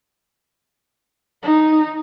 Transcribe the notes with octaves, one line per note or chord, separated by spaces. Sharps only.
D#4